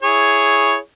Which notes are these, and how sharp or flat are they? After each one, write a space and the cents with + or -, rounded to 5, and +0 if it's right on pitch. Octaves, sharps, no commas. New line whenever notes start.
E4 +0 G#4 +0 C#5 +0